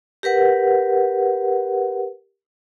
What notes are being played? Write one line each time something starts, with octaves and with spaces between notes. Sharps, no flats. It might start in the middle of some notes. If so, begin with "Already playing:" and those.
G4 A#4 B4 F#5